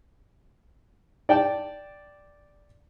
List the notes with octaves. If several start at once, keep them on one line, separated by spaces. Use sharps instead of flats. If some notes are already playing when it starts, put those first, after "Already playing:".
D5 G5 A5